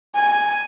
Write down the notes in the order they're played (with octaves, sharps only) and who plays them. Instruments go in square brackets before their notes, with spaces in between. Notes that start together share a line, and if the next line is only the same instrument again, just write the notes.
[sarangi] G#5